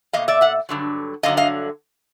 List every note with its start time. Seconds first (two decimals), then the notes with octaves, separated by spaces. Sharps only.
0.13 B2 G3 A#3 D#5 F5
0.28 D5 E5
0.41 E5 F#5
0.69 G2 D3 F#3
1.23 G2 D3 F#3 D#5 F5
1.37 D#5 F5